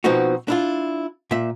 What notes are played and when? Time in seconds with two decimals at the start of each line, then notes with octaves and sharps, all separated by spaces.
0.04 B2 F3 C4 D#4 F#4
0.48 D4 E4 F4
1.31 A#2 E5